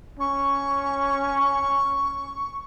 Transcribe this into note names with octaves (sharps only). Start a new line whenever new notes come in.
C#4 C#6